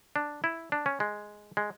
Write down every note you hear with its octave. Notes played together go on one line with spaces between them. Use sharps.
D4
E4
D4
C#4
G#3
G#3